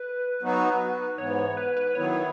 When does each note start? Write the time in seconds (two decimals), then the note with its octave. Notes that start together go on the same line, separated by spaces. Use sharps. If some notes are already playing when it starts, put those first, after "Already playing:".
Already playing: B4
0.42 F#3 B3 D#4 F#4
1.18 G#2 E3 B3 C#5
1.39 C#5
1.57 B4
1.77 B4
1.95 D#3 F#3 B3 E4 C#5